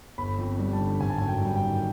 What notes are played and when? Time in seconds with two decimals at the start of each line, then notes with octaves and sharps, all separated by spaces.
0.18 G1 B5
0.38 F2
0.59 G3
0.73 A5
0.80 D3
1.01 G#1 G#5
1.10 A5
1.18 F#2 G#5
1.28 G5
1.41 G3
1.56 G5
1.63 D#3